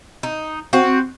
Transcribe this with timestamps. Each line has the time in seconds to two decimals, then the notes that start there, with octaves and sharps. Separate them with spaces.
0.23 D#4
0.73 C4 F#4